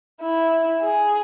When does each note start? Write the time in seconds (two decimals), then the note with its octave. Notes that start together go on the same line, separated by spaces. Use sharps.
0.21 E4
0.82 G#4